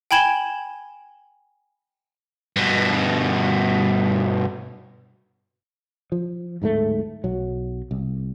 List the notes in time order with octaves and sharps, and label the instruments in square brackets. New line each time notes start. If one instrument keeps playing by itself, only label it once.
[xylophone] G5 G#5 B5 G#6 E7 G7
[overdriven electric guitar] G2 B2
[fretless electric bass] F3
D1 G#2 G3 A3
B1 F#3
C2